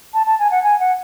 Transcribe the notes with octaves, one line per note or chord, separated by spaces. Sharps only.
A5
A5
G#5
F#5
G#5
F#5